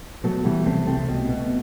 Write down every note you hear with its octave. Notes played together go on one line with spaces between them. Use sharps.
B2 F#3 A3
B2 E3 G3
C2 A3 C4
C2 A3 C4
B2
B2